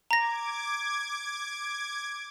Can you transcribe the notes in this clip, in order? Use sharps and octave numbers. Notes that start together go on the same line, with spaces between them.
A#5 D6 G#6 A#6